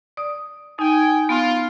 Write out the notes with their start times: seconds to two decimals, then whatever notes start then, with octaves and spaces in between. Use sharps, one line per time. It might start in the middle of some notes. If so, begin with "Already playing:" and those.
0.17 D5 D#6
0.79 D#4 G5 G#5
1.29 B3 F4